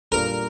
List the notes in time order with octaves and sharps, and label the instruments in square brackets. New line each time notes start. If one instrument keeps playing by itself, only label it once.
[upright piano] A#2 G3 D4 A4 [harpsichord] A#4